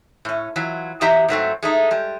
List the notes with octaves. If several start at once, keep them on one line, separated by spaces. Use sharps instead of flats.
A2 C#4
E3 F#3 F4
E2 F#3 G4 D#5 E5 A#5
G#2 F#3 A3 C4
G#3 A3 D#4
G3 G#3